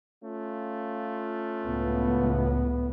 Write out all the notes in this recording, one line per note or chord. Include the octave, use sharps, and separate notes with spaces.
A3 C#4 F4
C#2 A2 B3